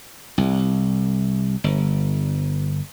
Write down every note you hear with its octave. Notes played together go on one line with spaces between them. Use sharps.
C2
G1